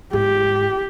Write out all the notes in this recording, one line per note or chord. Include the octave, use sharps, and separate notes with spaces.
G#2 G4